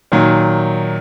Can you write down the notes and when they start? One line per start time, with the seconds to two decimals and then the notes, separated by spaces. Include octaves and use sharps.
0.12 A#2 D#3 F#3